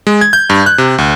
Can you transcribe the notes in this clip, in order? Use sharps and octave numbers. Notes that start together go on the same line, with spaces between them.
G#3
G#6
G6
G2
F#6
C3
D2